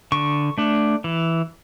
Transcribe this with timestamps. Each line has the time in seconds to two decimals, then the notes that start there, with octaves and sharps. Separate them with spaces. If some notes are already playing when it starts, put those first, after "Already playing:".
0.12 D3 C#6
0.58 A3 D4
1.04 E3